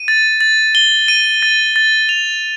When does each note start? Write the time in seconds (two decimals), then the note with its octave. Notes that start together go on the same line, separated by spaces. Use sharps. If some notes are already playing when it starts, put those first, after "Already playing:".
Already playing: D#7
0.08 A6
0.41 A6
0.75 G7
1.08 D#7
1.43 A6
1.76 A6
2.09 F7